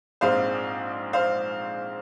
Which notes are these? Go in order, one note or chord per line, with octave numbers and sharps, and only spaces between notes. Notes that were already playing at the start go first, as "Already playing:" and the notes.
A#1 G#2 G#3 C4 C5 F5
C5 F5